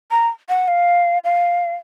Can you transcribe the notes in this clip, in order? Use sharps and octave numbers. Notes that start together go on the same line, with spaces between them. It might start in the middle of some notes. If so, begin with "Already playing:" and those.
A#5
F#5
F5
F5